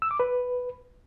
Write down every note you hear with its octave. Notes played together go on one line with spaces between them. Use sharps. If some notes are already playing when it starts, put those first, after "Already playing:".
E6
D6
B4